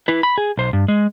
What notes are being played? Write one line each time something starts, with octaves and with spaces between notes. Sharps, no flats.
E4 B4
B5
G#4
B1 C5
G2
G#3